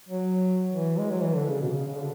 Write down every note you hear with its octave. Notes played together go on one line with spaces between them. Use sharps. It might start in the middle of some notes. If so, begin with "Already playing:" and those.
F#3
E3
G#3
F#3
E3
D3
C#3
B2
C#3
C#3
D3